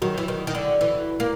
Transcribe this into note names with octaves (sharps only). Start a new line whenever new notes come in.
D#3 F#3
E3
D#3
D#3
D3
E3
A#3